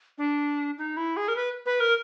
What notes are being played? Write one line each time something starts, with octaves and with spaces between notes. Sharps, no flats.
D4
D#4
E4
G#4
A#4
B4
B4
A#4